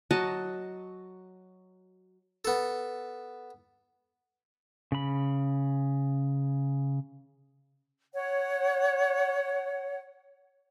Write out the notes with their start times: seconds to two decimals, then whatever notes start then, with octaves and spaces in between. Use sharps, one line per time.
0.11 F#3 F#4 D#5 A5
2.45 B3 A4
4.92 C#3 B5
8.14 C#5 F#5